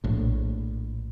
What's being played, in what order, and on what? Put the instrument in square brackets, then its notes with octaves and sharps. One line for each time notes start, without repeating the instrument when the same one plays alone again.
[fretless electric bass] A#1 A2